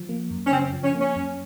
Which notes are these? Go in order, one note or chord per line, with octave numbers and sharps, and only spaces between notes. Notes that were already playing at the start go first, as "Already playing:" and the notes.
Already playing: F3
A#3
F#2
C#4
C#3 C4
F3
C#4
A#3 C#4
F#2